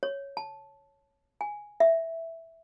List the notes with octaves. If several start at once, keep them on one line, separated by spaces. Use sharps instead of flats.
C#5
A5
G#5
E5